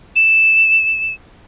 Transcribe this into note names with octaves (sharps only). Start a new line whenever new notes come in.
E7